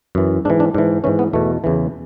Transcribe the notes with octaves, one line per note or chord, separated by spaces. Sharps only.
F#2 E3
G#2 E3 D4
D4
G#2 E3 D4
G#2 E3 C#4
B3
E2 B2 A3
E2 C#3 E3